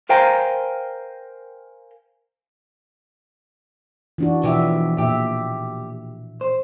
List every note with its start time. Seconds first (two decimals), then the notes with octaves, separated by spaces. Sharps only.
0.09 A#4 C5 F5 G5 G#5 A#5
4.18 E3 D4 F#4
4.44 B2 E3 F3 G4 E5
4.98 A#2 G4 E5
6.41 C5